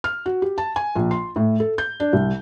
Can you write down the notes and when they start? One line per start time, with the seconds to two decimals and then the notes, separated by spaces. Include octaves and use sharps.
0.04 F6
0.26 F#4
0.42 G4
0.58 A5
0.76 G#5
0.96 A#1
1.11 C6
1.36 A2
1.60 A4
1.78 G6
2.00 D4
2.13 C2